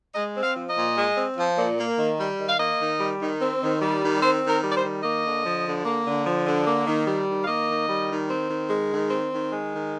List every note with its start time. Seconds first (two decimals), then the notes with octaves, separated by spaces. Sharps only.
0.15 G#3 D#5
0.36 C4
0.43 F5
0.56 F3
0.70 D#5
0.76 A#2
0.97 G#3
1.18 C4
1.37 F3
1.58 A#2
1.78 A#3
1.99 D#3
2.19 G3
2.39 D#3
2.49 F5
2.59 A#3 D#5
2.80 D#3
3.00 G3
3.20 D#3
3.41 C4
3.62 D#3
3.81 G3
4.02 D#3
4.22 C4 C5
4.42 D#3
4.49 A#4
4.63 G3
4.72 D5
4.77 C5
4.83 D#3
5.03 A#3 D#5
5.24 D3
5.45 F3
5.65 D3
5.85 A#3
6.06 D3
6.26 F3
6.46 D3
6.67 A#3
6.87 D#3
7.07 G3
7.28 D#3
7.44 F5
7.47 A#3 D#5
7.69 D#3
7.88 G3
8.10 D#3
8.29 C4
8.49 D#3
8.70 G#3
8.91 D#3
9.10 C4
9.32 D#3
9.52 G#3
9.72 D#3